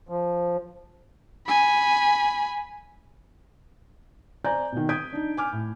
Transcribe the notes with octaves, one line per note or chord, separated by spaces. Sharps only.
F3
G#5 B5
C5 D5 G#5 A#5 G6
B2 D#3
D#6 G6 G#6 B6 D7
D4 D#4
G#5 D6 F6
A2